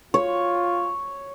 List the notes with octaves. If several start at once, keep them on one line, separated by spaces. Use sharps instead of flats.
F4 C#5